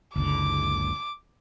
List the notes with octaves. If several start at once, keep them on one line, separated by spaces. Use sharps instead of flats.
F#1 C#2 D3 D6